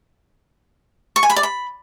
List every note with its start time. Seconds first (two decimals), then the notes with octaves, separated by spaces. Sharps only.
1.16 C#6
1.23 G#5
1.30 B5
1.36 D5
1.43 B5